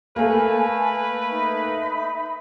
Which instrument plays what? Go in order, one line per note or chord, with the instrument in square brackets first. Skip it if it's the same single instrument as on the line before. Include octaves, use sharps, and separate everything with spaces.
[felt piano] A3 A#3 [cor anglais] B4 [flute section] G#5 A5
[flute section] D#4 E5 B5